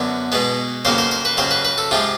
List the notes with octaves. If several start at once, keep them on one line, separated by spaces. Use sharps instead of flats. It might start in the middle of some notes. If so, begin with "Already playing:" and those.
Already playing: F#2 D3 F#3 B3
B2 G#3 B3
F2 C#3 F#3 A#3 C5
C5
C5
B4
F2 C#3 F#3 C5
B4
B4
A4
C3 F3 G#3 F4